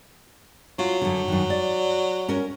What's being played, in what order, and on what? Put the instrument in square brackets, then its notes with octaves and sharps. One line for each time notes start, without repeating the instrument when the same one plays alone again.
[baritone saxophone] F#3 [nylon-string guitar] F4
[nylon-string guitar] F#2 D3
F#2 D#3
D5
C#4 A#4